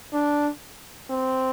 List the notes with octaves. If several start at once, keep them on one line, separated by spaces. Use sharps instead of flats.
D4
C4